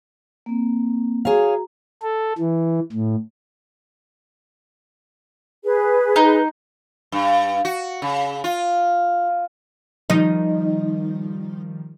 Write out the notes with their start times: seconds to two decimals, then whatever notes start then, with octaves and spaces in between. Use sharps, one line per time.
0.46 A#3 C4
1.25 F#4 G#4 C#5 F5 A#5
2.02 A4
2.38 E3
2.93 A2
5.64 G#4 B4
6.16 D#4
7.12 G2
7.65 F#4
8.02 C#3
8.44 F4
10.10 D#3 F3 G3 D#4